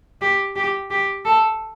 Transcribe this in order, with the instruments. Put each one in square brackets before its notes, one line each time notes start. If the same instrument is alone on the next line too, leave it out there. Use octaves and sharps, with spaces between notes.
[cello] G4
G4
G4
A4